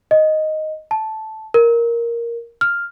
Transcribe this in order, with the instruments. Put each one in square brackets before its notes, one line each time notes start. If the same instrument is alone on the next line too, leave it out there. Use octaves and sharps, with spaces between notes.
[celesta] D#5
A5
A#4
F6